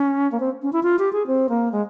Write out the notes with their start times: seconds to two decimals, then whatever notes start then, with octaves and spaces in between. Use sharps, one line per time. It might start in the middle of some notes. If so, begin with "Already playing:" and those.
Already playing: C#4
0.32 A#3
0.40 C4
0.62 C#4
0.73 E4
0.83 F4
0.99 G4
1.13 G#4
1.27 C4
1.49 A#3
1.72 G#3